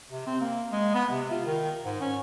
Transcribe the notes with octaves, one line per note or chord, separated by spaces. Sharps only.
C3
C4
A#3
G#3
B3
C3
F4
D#3
G#2
C#4